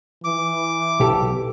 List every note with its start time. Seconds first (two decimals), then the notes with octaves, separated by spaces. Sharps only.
0.24 E3 D6
1.00 B1 G4 A4